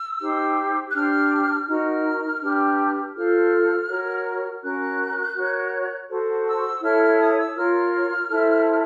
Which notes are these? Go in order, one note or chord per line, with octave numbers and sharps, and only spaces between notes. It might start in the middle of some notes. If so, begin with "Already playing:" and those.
Already playing: E6
D#4 G4 C5
F#6
D4 G4 C5 F6
D#4 F#4 A#4 F6
D4 G4 B4
F4 A4 C5 F6
F#4 A#4 C#5
C#4 F#4 A#4 F#6
F#4 A#4 C#5
F#4 A4 C5
E6
E4 A4 C#5 F6
F6
D#6
E6
F4 A#4 C#5 F6
E4 A4 C5